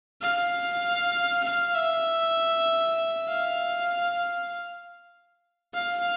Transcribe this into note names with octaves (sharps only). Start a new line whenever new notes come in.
F5
F5
E5
F5
F5